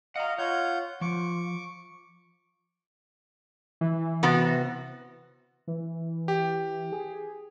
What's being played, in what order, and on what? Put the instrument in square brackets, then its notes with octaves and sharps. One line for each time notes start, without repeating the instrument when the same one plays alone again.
[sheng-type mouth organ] D#5 F5 [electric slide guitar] F#5 A#5
[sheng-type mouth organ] F4 F#5 G6 [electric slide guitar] C#5
[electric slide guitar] F3 [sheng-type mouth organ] C#6 D6
[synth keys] E3
[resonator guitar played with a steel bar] C3 B3 F#4
[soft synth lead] E3
[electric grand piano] G4
[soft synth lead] G#4